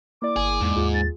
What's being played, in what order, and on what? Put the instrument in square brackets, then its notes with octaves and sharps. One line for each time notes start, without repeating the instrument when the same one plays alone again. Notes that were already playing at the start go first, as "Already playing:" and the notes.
[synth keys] A#3 E4 D5 [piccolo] D6
[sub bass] G1 [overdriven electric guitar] G#4
[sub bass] E2 [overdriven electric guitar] G#2
[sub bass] D#2 [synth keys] F4 G#4
[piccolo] A6